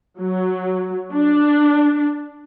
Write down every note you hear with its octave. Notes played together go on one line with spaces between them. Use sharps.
F#3
D4